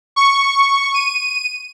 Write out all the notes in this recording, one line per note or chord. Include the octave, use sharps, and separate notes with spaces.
C#6
D#7